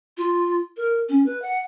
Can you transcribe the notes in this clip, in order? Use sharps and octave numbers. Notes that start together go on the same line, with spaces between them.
F4
A#4
C#4
B4
F#5